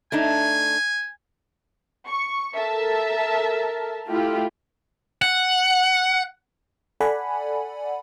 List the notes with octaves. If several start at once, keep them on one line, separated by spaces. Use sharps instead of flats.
A3 D4 D#4 G#5
C#6
A4 A#4 E5 A5
A3 E4 F4 G4
F#5
A4 D5 F#5 G#5 B5